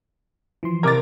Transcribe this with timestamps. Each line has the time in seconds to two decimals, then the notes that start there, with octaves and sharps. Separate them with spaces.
0.63 E3 F3 C6
0.83 C3 A#4 A#5 D6 G#6 A6